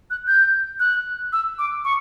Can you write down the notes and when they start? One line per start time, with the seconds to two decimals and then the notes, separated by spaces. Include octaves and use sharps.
0.10 F#6
0.27 G6
0.80 F#6
1.33 E6
1.59 D6
1.85 C#6